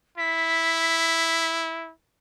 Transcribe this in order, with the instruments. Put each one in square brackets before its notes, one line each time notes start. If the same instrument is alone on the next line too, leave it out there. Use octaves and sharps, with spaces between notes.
[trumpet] E4 [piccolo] B6